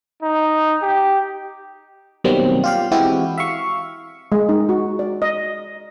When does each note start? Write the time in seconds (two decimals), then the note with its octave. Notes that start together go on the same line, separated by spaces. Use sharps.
0.22 D#4
0.82 G4
2.24 B2 D#3 F#3 G3 A#3 C4
2.64 F4 G4 F5
2.91 E3 G#3 C4 E4 F#4 G4
3.38 E5 F5 C#6
4.32 G#3
4.49 D#4
4.69 F#4
4.99 D5
5.22 D#5